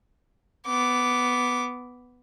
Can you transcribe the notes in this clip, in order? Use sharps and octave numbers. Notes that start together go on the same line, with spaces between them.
B3 D6